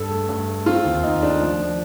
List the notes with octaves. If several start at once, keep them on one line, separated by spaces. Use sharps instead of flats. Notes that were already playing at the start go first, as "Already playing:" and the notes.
Already playing: G2 A4
A3
G2
A3
C4 F4
D#2
D#2 D#4
A3 D4
F3
F3